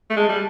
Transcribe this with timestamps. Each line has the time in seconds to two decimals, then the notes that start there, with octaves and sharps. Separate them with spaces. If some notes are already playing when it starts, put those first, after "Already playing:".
0.10 A3
0.16 G#3 A5
0.29 G3